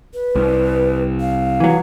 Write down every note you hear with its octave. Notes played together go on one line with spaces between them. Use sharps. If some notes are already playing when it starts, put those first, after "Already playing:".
B4
C2
F5
E3 F#3